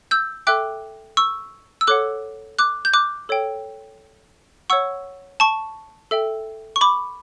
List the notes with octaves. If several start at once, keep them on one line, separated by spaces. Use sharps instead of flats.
E6 G6
A4 E5 G5 D6 F#6
C#6 E6
E6
A4 C#5 F#5 D6 F#6
D6 F#6
G6
D6 F#6
A4 C#5 G5
C#5 F#5 C#6 E6
A5 C#6
A4 E5 G5
C#6
B5 D6